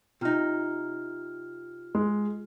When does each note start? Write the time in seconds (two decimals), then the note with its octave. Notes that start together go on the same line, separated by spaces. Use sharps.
0.21 C3 D#4 F4 F6
1.95 G#3